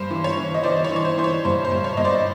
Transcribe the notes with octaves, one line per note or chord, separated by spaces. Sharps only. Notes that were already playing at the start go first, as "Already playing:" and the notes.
Already playing: G2 C5
E3
C#5
E3
D#5
E3 C5 D5
C#5
E3
C#5
C5
E3 C5
C#5
G2 C5
C5
G2
C#5
G2 D#5
C5 D5